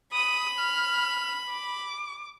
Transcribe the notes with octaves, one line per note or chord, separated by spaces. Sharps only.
B5 D#6
F6
D6